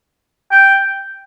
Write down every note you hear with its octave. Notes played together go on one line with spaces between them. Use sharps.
G5